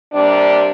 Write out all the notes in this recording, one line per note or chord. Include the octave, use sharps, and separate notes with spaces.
C3 G3 A#3 D4